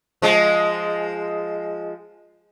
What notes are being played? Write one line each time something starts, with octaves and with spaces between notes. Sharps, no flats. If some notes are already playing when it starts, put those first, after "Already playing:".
F3 G#3